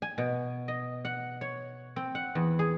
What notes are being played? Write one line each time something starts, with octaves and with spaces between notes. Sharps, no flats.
G#5
B2
D#5
F#5
C#5
C4
F#5
E2
G#4